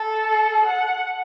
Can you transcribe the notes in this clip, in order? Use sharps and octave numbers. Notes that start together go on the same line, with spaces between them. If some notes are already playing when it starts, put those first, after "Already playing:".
Already playing: A4
F#5